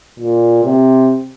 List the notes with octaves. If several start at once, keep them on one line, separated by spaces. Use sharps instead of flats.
A#2
C3